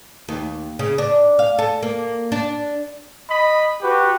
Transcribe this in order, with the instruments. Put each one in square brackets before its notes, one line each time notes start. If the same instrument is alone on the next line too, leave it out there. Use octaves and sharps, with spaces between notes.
[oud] D#2
C#3
D4
F5
A4
A#3
D4
[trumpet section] D#5 B5
F#4 G4 B4